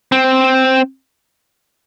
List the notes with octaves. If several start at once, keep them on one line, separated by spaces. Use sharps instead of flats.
C4